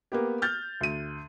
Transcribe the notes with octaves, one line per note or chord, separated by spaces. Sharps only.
A#3 B3 G4
F6 G6 A6
D2 D#7